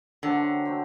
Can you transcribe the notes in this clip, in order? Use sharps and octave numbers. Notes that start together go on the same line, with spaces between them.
F#2 D3 F#3 A3 C4
F#3 A3 C4